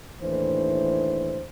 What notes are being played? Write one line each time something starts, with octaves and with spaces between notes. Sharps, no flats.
D#2 A2 E3 D4 C5